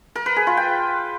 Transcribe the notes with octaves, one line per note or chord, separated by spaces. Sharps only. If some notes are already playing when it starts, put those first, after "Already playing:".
A#4
B4
G#4
F4
G5